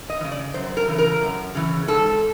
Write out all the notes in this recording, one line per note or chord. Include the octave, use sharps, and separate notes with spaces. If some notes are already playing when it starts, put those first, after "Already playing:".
D#5
E3
C#3
D5
F#2 C5
A#4
C#3 E3
A#4
F#2
C#3 E3
G#2 A4